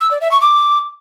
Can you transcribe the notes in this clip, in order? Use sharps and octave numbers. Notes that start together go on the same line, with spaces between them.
E6
D5
E5
C#6
D6